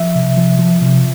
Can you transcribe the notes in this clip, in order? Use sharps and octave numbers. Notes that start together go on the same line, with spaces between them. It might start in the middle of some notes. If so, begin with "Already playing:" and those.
Already playing: F3 E5
C3
F3
F3
C3